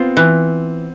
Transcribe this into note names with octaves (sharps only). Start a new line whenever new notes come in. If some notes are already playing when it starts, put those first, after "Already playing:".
Already playing: B3 C4 F4
E3